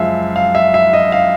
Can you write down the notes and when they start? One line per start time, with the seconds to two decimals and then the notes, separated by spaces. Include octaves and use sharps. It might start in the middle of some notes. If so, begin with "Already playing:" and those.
Already playing: F#2 C#3 F3 G#3 E5 F5
0.36 F5
0.55 E5
0.74 E5
0.93 D#5
1.12 F5